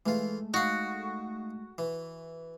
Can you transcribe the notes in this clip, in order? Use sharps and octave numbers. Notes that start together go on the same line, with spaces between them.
E3 G#3 A3 F4
D#4 F#4 F5
E3